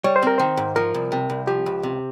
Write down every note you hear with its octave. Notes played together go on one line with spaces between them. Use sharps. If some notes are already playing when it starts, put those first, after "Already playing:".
G3 C#5
C5
C4 A#4
D#3 C5
G#2
F3 A#4
C2
C3
C2
F3 G4
C#2
C3